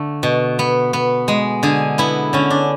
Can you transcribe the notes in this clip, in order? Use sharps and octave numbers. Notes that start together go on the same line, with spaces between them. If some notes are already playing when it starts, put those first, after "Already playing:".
Already playing: D3 A3
B2
B3
B3
G#3
D3 G#4
B3 E4
D3 C#4
D4